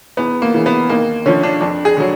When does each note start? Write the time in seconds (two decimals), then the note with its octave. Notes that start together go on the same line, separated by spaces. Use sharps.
0.17 E2 B3
0.42 A#3
0.54 C#3 E3
0.66 B3
0.89 D#2 A#3
1.26 D3 F3 C#4
1.43 D4
1.61 F2 D4
1.85 G#4
1.97 D3 F#3